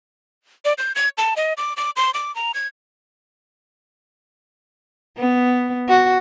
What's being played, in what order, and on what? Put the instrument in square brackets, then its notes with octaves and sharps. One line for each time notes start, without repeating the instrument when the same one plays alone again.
[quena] D5
G6
G#6
A5
D#5
D6
D6
C6
D6
A#5
G#6
[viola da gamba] B3
F#4